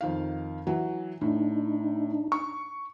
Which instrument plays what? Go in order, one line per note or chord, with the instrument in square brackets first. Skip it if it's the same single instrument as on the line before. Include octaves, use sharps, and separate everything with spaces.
[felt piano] F2 D#3 F5
E3 F#3
[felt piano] A2 [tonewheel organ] D4 D#4
[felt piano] C#6